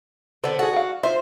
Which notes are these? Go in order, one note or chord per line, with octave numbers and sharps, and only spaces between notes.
D3 B3 A4 C5
F#4 G#4 A4
F5 F#5
F4 C5 E5